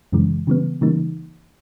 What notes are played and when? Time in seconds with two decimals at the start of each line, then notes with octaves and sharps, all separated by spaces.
0.12 F#2 C#3 E3 G#3
0.47 C#3 E3 G3 B3
0.81 C#3 E3 G3 A#3 D#4